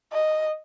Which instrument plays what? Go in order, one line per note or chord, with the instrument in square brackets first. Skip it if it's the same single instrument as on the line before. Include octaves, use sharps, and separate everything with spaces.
[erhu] D#5